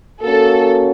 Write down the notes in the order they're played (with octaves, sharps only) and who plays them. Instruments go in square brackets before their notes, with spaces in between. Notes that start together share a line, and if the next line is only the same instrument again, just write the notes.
[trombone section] A#3 C#4 F#4 [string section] A4